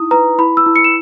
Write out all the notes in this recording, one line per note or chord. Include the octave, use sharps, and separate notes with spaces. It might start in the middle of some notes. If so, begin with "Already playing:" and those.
Already playing: D#4 E4 D#6
B4 A#5
E4 B5
E6
E4
C#7
E7